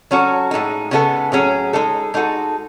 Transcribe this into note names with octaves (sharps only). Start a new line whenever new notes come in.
F#3 C#4 F#4 A4
A2 G#3 D#4
C#3 G#3 B3 E4 A4
A2 F#3 C#4 G#4
G#3 D#4 A4
G#3 D#4 F#4 A4